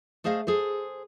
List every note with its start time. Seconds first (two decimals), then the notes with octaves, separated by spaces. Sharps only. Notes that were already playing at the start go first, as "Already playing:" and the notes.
0.24 A3 G#4 C5 D#5 F5
0.47 G#4 A4 C5